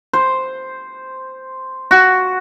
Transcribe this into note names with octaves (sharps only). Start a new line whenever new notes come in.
C5
F#4